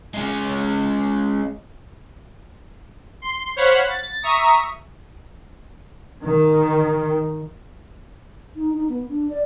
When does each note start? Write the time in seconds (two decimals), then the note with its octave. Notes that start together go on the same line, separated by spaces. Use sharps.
0.14 G#3 C#4
3.22 C6
3.56 C5 C#5 F5 F#5 B5
3.90 A6
4.22 E5 A#5 C#6 D#6
6.23 D#3
8.55 D#4
8.74 D#4
8.89 B3
9.09 D4
9.30 D5